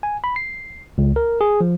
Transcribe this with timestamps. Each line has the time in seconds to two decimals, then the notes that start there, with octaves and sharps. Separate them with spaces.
0.03 G#5
0.24 B5
0.36 C7
0.98 C#2
1.16 A#4
1.41 G#4
1.61 F3